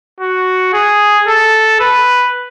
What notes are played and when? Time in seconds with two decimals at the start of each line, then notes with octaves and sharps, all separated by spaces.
0.20 F#4
0.73 G#4
1.27 A4
1.80 B4